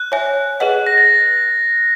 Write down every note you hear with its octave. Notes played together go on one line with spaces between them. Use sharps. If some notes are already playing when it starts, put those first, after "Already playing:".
Already playing: F#6
C#5 E5 G#5
G#4 B4 D#5 F#5
A#6
A6